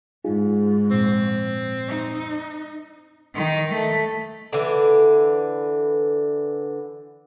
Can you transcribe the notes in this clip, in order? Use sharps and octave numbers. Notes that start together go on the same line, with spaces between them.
G#2 D#4 F4 G#4
F2 A#2 C4
D#4
D#3
A3
D3 E3